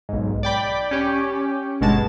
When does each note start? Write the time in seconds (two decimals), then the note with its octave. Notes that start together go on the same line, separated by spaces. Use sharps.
0.09 B1 G#2
0.43 D5 G5 B5
0.91 C#4 G4
1.81 G1 B2 G#3 A5